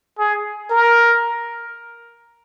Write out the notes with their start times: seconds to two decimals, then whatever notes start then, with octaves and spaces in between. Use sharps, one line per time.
0.19 G#4
0.70 A#4